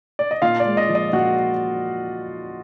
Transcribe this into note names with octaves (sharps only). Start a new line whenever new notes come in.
D5
D#5
A#2 F4 F5
D5
G#3
D#5
F3
D#5
A#2 F#4 F#5